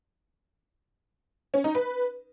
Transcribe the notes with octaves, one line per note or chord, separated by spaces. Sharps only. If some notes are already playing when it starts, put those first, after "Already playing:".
C#4
D#4
B4